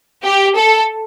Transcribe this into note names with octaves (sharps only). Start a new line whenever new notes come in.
G4
A4